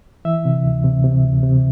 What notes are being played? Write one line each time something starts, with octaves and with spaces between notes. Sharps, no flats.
E3 E5
C3
D2
C3
C3
D2
C3